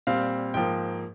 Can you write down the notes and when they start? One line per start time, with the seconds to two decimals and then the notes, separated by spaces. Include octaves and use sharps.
0.07 A#2 G3 C4 F5
0.54 G#2 F3 A#3 G5